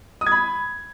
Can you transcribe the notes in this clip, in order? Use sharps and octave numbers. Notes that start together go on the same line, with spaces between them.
D#6
G#6
B5